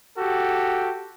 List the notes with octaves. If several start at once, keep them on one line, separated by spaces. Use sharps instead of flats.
F#4 G4 A4